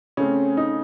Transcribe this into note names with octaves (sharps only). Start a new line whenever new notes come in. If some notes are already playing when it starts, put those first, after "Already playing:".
C#3 A3 C4 C#4
D#4